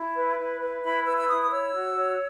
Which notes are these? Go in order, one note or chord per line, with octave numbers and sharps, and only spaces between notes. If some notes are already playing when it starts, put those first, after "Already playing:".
Already playing: E4
B4
E4
B4
E4 B5
B4 E6
E6
E4 D#6
D#6
C#5 E6
F#4
C#5